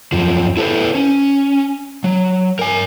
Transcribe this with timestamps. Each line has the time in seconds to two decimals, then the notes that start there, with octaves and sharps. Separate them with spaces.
0.12 F#2 F3
0.57 E4 A4 B4 C5
0.95 C#4
2.04 F#3
2.59 A#4 G#5